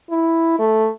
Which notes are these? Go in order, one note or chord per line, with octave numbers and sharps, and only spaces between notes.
E4
A3